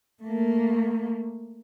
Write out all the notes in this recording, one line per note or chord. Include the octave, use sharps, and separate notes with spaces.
A3 A#3